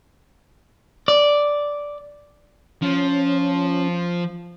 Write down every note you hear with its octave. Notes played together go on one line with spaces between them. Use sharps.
D5
F3 C#4